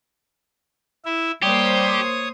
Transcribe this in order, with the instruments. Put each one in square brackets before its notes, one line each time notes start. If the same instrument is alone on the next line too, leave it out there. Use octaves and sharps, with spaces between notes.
[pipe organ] E4 E5
[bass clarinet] G3 [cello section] A#3 C5 [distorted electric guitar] G4 [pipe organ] C#5 D#6